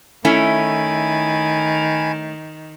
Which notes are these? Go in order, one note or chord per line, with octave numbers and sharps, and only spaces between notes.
D#3 A3 C#4 E4 G#5 B5